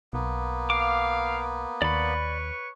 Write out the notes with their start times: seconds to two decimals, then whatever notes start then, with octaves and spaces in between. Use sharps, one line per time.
0.13 B1 A#3 B3
0.70 F5 D6
1.82 D#2 B4 C#5 D5 B5 C#6